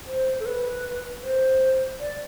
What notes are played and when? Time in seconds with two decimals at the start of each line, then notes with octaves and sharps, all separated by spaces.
0.07 C5
0.40 A4
0.46 B4
1.23 C5
2.00 D5